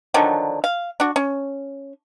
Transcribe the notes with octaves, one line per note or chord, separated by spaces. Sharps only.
D3 D#3 F3 F#3
F5
D4 F#4
C#4